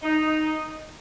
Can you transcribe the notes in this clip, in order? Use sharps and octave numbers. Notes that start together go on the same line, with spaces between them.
D#4